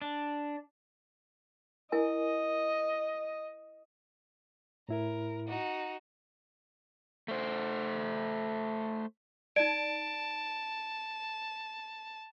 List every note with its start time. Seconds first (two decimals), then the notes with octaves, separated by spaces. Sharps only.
0.02 D4
1.92 E4 A#4 D#5 G#5
4.89 A2 E4 A#4
5.47 D#4 F#4
7.28 A3 C5
9.56 D#4 D5 A5 D7